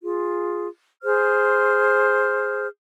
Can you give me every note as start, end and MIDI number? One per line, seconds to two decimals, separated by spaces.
0.04 0.66 65
0.04 0.66 68
1.03 2.68 68
1.03 2.68 72
1.03 2.68 89